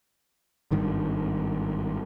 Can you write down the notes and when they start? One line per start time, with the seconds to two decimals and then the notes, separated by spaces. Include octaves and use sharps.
0.71 G#1 G2 D#3